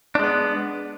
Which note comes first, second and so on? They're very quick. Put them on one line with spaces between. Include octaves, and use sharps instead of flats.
D4 G#3 B3